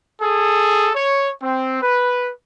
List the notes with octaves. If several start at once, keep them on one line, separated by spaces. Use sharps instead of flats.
G#4 A4
C#5
C4
B4